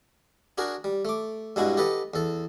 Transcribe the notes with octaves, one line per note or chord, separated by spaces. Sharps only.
D4 F#4 G#4 A#4
G3
A3 D6
G2 B2 G#3 E4 F#4
G4 A4 B4 D#5 F#5
E2 A4